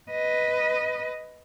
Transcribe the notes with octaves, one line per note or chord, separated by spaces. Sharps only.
B4 D#5